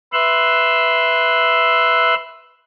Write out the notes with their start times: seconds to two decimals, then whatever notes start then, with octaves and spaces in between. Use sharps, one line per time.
0.13 B4 E5 C6 E6 F#6